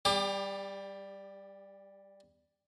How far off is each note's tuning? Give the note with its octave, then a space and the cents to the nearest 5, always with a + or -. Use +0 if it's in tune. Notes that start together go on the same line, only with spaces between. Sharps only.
G3 +0 G4 +35 D6 +30